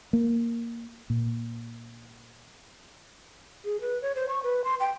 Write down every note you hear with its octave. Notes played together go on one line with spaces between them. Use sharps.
A#3
A#2
G#4
B4
C#5
C5
C#6
B4
C6
G5